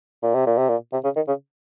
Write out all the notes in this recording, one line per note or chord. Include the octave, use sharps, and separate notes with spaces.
A#2
C3
A#2
C3
A#2
C3
C#3
D#3
C#3